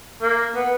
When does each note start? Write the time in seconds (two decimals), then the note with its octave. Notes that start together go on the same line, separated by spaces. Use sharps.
0.22 A#3
0.55 B3